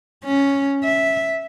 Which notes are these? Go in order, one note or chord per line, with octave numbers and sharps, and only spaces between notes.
C#4
E5